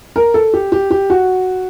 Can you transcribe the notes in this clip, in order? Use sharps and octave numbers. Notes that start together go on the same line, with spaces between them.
A#4
A4
G4
G4
G4
F#4